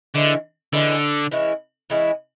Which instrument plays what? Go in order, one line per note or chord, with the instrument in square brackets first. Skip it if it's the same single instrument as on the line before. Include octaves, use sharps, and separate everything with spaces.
[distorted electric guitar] D3 [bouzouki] E3 G#3 C#4 E4
[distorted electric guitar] D3 [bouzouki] E3 G#3 C#4 E4
[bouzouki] E3 G#3 C#4 E4
E3 G#3 C#4 E4